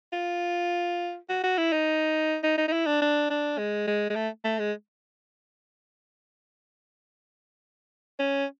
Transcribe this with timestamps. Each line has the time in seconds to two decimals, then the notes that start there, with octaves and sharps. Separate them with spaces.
0.13 F4
1.29 F#4
1.43 F#4
1.58 E4
1.72 D#4
2.43 D#4
2.58 D#4
2.68 D#4
2.72 E4
2.86 D4
3.02 D4
3.30 D4
3.58 G#3
3.87 G#3
4.10 G#3
4.15 A3
4.44 A3
4.59 G#3
8.19 C#4